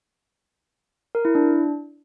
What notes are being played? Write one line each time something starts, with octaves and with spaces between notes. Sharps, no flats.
A#4
E4
D4